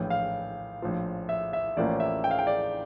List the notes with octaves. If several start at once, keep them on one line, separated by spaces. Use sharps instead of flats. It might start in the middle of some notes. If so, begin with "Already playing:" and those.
Already playing: A#1 A2 E3 G5
F5
A#1 A2 F3
E5
E5
A1 A2 F3 A#3 C#4 D5
E5
G5
F5
G5
D5